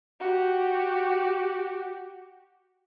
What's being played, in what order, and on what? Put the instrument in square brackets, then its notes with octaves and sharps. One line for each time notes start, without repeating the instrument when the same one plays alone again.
[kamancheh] F#4 G4